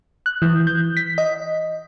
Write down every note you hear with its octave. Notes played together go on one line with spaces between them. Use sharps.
F#6
E3
G6
B6
D#5